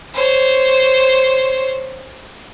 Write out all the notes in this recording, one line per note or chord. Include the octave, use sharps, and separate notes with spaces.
C5 C#5